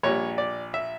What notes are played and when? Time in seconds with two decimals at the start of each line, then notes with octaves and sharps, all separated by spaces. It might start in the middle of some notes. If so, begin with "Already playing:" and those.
0.03 A#1 A#2 G3 C#5
0.38 D5
0.74 E5